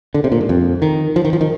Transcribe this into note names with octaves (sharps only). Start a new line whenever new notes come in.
D3
C3
A#2
G#2
F2
D#3
F3
D#3
F3
D#3